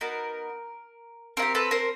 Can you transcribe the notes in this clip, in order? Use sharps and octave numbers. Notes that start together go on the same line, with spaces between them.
B3 D#4 F#4 A#4
C4 E4 A#4
G4
A4 B4
A#4 C5